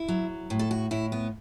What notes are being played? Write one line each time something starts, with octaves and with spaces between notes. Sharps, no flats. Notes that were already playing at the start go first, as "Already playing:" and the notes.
Already playing: E4
F#3
A2
A4
F#4
A2 E4
B3